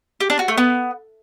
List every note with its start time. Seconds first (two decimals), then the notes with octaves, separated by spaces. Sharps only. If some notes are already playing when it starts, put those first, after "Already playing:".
0.20 G4
0.30 D4
0.39 F#4
0.48 A3
0.58 B3